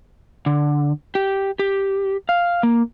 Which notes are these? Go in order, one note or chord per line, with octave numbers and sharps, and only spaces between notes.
D3
G4
G4
F5
A#3